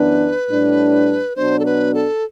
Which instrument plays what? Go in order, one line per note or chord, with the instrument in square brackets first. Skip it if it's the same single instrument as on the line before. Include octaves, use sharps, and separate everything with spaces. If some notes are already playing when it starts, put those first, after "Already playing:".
Already playing: [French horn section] F#2 E3 B3 D4 [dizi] B4
[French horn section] A2 G3 D4
[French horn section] B2 F#3 B3 D4 [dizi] C5
[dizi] A4
B4
A4